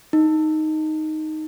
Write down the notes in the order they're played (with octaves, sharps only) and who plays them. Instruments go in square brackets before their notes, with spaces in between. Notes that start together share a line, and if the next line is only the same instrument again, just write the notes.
[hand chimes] D#4